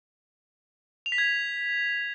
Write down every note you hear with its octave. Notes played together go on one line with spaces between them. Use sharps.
F7
B6
G#6
F7